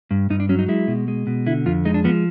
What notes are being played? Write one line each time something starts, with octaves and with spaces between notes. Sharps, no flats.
G2
G2 D#4
D4
F#3 C#4
D#4
G#3 E4
B2
G#3
B2
D3 E4
F2 F4
G#3 D#4
D4
F3 B3